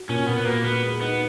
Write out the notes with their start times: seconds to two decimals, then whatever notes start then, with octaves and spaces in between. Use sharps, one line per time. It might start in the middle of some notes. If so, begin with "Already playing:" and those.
Already playing: F#4
0.09 A#2 C#4
0.27 A#2 B3
0.45 A#3 F#4
0.64 B3 F#4
0.82 G#3
1.01 B3 D#4